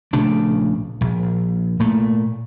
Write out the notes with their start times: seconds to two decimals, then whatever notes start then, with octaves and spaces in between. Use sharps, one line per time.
0.13 A#1 C#3 A3 D4
1.01 A#1
1.80 A#2 A3